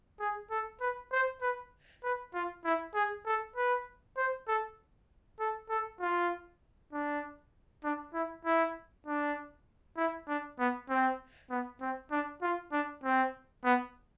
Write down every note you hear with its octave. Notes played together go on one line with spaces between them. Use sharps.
G#4
A4
B4
C5
B4
B4
F4
E4
G#4
A4
B4
C5
A4
A4
A4
F4
D4
D4
E4
E4
D4
E4
D4
B3
C4
B3
C4
D4
F4
D4
C4
B3